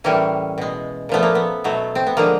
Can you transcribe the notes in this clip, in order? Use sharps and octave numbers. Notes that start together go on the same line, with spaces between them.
A2 E3 G3 A#3 C#4
B2 G#3
A#2 F3 A3 B3
A#3
B3
B2 F#3 A3
C4
B3
D3 F3 G#3 A#3